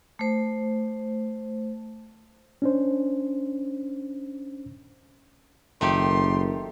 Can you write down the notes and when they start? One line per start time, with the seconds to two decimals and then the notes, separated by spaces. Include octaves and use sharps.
0.19 A3 C5
2.62 C#4 D4 C5
5.81 F#1 D#3 A3 G4 C6